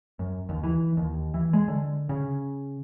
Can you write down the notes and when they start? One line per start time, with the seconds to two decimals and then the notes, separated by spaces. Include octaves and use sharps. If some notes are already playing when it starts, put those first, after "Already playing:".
0.19 F#2
0.49 D#2
0.64 E3
0.97 D#2
1.34 E3
1.53 G#3
1.68 D3
2.09 C#3